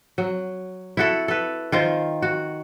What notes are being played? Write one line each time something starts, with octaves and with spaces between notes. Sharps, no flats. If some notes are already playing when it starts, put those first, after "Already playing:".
F#3
E4 F#4 A4
A4 B4
D#3 F4 C5
F#4